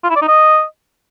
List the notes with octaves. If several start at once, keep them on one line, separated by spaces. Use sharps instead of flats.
F4
E4
D5
D#4
D#5